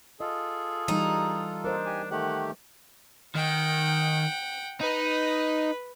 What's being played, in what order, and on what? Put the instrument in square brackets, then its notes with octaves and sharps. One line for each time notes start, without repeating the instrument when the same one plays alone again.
[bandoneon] F4 A4 [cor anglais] G#4 [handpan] D#5
[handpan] E3 G3 [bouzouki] D#4
[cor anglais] D4 [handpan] A#4 C5 D#5
[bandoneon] G4 G#5
[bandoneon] D#3 A3 G4 [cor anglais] F#5
[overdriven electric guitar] D#3 [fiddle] F#5 G5
[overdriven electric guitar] D#4 [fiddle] B4